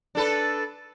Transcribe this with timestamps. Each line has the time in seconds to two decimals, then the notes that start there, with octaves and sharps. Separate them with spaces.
0.15 D4 A4 B4